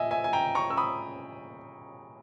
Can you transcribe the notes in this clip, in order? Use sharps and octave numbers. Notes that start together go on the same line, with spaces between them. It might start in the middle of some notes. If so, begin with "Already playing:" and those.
Already playing: A#2 D#5 E5 G#5
E5 G#5
G#5
G5 A#5
A#5 C#6
E6
B5 D#6